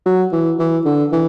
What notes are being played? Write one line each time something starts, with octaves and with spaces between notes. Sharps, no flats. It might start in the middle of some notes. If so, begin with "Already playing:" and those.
F#3
E3
E3
D3
E3